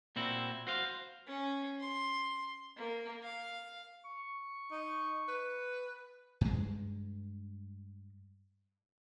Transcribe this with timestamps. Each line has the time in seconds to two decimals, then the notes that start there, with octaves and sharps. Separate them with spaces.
0.16 A#2 C4 E4 F#4
0.67 F#4 C5 F5
1.27 C#4
1.80 C6
2.77 A#3
3.23 F5
4.05 C#6
4.71 D#4
5.28 B4
6.41 G2 G#3